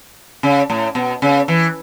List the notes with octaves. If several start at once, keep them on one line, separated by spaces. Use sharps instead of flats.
C#3
A2
B2
C#3
E3